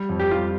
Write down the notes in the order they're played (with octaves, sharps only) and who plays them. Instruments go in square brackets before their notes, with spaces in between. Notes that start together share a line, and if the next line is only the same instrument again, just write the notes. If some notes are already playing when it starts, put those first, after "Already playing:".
Already playing: [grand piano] G3
F2
[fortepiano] G4
[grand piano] G3 [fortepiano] F4